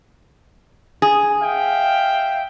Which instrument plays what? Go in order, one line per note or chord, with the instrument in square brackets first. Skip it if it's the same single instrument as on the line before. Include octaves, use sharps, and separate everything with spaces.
[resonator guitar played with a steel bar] G#4
[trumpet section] E5 F5 G5